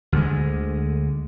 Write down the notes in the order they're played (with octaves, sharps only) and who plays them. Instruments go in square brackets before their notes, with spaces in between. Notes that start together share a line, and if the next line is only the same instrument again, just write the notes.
[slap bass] D2 D3 G#3